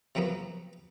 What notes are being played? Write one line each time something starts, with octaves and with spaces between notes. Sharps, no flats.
C3 F3 F#3 A#3 B3